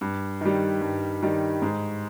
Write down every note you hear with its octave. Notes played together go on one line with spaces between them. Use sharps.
G2
D#3 G3
G2
D#3 G3
G#2